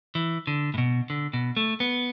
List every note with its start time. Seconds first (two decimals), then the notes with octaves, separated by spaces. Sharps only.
0.15 E3
0.47 D3
0.74 A2
0.78 B2
1.10 D3
1.33 B2
1.57 A3
1.80 B3